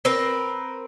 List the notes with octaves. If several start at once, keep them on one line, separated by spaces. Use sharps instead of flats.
C4 A#4 B4